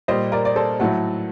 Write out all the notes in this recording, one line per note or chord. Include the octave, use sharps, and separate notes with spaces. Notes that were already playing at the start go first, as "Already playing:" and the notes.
A#2 G3 C5 D#5
A#4 D5
D5
A4 C5
A2 F#3 A3 F#4 A4